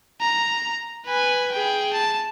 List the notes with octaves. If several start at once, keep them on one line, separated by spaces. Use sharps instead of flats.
A#5
B4 G#5
G#4 G5
A5